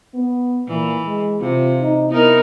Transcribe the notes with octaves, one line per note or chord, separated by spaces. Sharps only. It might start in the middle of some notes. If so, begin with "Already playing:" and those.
B3
A#2 E3
G#3
C3 F4
D#4
B3 D#4 E4 A#4